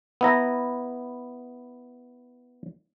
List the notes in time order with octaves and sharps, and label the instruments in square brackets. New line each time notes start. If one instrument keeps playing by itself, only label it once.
[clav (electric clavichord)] B3 E4 A#5